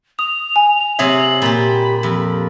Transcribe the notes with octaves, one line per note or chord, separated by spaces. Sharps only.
D#6 F7
G#5
C3 F#3 G#4 E5 F#7
A#2 G4 B5
F2